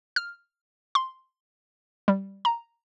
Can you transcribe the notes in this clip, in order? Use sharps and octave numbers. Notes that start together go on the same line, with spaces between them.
F6
C6
G3
A#5